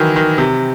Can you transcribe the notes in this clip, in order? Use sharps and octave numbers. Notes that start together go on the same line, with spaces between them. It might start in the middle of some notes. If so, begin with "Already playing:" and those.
Already playing: D#3 E3 F#3
D#3
C3